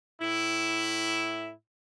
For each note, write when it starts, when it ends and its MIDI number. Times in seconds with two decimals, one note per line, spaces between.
0.22 1.53 45
0.22 1.53 64